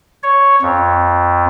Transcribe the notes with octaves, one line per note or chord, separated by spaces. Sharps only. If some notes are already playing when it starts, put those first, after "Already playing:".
C#5
F2